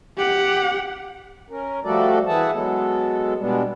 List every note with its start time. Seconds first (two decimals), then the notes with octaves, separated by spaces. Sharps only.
0.18 G4 F#5
1.50 C#4 A#4
1.84 F3 G3 A3 F#4 A4 D5
2.27 E3 B3 G#4 E5 F#5 A5
2.52 F#3 G#3 B3 A4
3.39 B2 G3 G#3 B3 D4